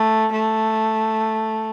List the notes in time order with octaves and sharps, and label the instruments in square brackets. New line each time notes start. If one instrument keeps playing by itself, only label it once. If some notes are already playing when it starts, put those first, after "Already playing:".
Already playing: [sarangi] A3
A3